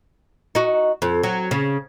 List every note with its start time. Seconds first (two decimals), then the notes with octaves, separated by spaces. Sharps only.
0.55 D#4 F#4
1.02 F2
1.23 F#3
1.51 C#3